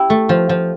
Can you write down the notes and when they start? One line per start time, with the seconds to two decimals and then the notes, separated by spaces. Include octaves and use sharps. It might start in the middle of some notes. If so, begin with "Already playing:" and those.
Already playing: E4 G4
0.10 A3
0.29 F3
0.49 F3